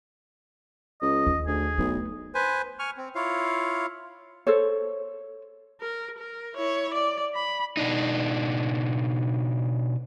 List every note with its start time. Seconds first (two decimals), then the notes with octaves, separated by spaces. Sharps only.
1.02 C#2 D#5
1.27 D#2
1.47 D2 G#4
1.78 B1 A3
2.35 B4 C5 G#5
2.79 G#5 C#6 F6
2.97 C4
3.15 E4 F4 C#5 F5
4.47 A4 C5 C#5
5.81 A#4
6.18 A#4
6.55 E4 C#5
6.94 D5
7.35 B5
7.77 B2 D4 D#4